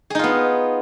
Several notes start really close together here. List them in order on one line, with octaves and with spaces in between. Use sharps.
G#4 D#4 F4 B3